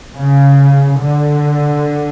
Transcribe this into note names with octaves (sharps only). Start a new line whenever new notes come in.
C#3
D3